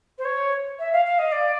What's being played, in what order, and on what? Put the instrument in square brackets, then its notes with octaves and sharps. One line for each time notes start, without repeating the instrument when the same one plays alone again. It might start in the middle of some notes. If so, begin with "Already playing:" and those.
[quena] C5
C#5
E5
F5
F5
D#5
D5